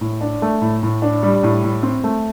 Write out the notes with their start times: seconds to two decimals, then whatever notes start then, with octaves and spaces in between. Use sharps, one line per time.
0.01 A2
0.21 D4
0.42 A3
0.62 A2
0.83 A2
1.02 D4
1.23 G3
1.43 A2
1.64 A2
1.83 C4
2.04 A3